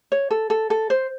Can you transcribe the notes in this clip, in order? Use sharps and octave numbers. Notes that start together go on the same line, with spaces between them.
C#5
A4
A4
A4
C5